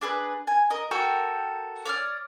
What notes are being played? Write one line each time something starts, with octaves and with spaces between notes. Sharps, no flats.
D4 G#4 A4 B4
G#5
A#4 D#5
F#4 A4 A#4 G5
C#5 D5 D#6 F6